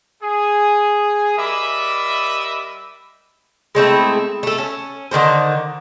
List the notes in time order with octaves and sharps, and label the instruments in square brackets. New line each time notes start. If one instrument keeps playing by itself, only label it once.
[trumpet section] G#4
G3 A#4 D#5 E5 B5 D6
[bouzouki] G#3 A3 C4 E4
A3 A4
C#4
D3 D#3 G#3 C5